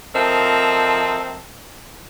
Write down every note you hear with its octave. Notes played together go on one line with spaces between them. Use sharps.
F3 C4 A4 A#4 D#5 E5